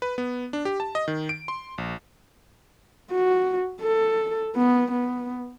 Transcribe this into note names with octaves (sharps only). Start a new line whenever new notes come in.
B4
B3
D4
G4
A5
D#5
D#3
D7
C6
A#1
F#4
A4
B3
B3